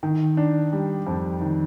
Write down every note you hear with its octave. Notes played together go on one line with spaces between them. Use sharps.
D#3
D4
G3
F2
D#3